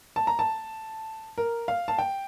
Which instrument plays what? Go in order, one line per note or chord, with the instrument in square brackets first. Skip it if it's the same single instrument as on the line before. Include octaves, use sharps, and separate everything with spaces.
[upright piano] A5
A#5
A5
A#4
F5
A5
G5